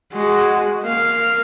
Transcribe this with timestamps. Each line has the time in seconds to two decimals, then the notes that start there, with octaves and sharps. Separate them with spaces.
0.13 G#3 F#4
0.83 A#3 F5